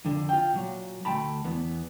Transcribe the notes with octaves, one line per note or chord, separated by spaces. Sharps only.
F2 D3
F4 G5
A#2 F#3
D2 A3 G5 A5 B5
E2 B3